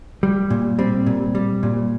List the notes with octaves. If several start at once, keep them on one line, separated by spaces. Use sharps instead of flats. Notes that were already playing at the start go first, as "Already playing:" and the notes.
G3
A#2
G3 C4
A#2
G3
A#2